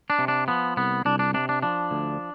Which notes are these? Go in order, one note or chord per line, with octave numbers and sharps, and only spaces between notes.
D4
C3
D4
F3 B3
C2 B3
C2 D4
D4
C3 D4
D4
F3 D4
D2